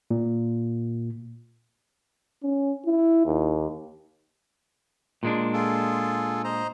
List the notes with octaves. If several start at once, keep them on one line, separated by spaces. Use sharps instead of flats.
A#2
C#4
E4
D#2
A#2 G#3 D4
F4 G#4 A4
C5 D#5 A#5